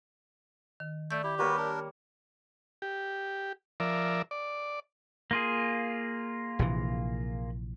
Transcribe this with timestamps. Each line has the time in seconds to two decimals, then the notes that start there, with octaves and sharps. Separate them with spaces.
0.80 D#3
1.11 A3 D5 G6
1.23 E4 G4
1.39 G3 A#3 F#4 B4 C#5
1.57 D4 A#4
2.82 G4
3.80 F3 A#4 D5 E5
4.31 D5
5.31 A#3 F4 G#4
6.59 A#1 C3 E3